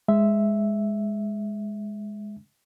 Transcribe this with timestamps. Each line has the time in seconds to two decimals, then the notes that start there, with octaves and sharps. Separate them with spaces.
0.08 G#3 E5